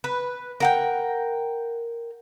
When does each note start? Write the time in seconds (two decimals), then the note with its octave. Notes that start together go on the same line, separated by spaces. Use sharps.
0.04 B4
0.60 A#4 F#5 G5